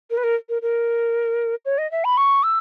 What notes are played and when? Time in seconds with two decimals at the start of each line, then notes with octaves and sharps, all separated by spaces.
0.10 A#4
0.17 B4
0.24 A#4
0.49 A#4
0.62 A#4
1.65 C#5
1.78 D#5
1.91 E5
2.04 B5
2.17 C#6
2.43 E6